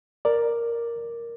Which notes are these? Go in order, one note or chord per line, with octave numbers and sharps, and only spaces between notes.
A#4 D5